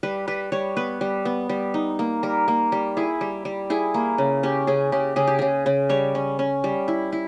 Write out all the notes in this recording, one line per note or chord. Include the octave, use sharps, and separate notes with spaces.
G3 B4
G3 B4
G3 C#5
B3 B4
G3
B3
G3
D#4
A#3
G3 A#4
A#3
G3
E4 G#4
G3
G3
E4 G#4
A#3
C#3
C#4 G4
C#3 G#4
C#3 G4
C#3 G#4
G4
C#3 G#4
C#3
G3 C#5
C#4
C#4
G3
E4
E4